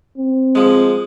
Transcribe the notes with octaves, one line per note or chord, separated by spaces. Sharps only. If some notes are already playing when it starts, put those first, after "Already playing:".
C4
F3 G#3